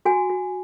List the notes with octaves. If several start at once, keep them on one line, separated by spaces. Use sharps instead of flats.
F#4 G#5
F#4